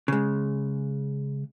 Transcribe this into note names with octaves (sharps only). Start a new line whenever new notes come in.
C#3 G#3